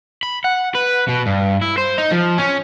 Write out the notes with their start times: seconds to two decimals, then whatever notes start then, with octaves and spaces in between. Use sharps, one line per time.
0.23 B5
0.44 F#5
0.75 B4
1.09 B2
1.27 G2
1.62 E4
1.78 C5
1.98 D#4
2.12 F3
2.38 C#4